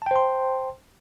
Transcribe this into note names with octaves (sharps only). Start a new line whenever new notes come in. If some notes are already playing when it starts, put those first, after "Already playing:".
C5 G5 A5 C6